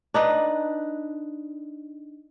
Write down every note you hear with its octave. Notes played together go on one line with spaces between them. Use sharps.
D4 D#4 B4